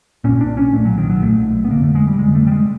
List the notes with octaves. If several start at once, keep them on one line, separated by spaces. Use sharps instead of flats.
B1 A#2 C#4
D4
C#4
B1 A#2 A3
F#3
D#3
F#3
B1 A#2 A3
B3
F1 D#2 D3 A#3
A3
G#3
G3
F1 D#2 D3 G#3
A3
G3
G#3